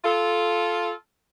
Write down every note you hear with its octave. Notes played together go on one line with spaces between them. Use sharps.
F4 A4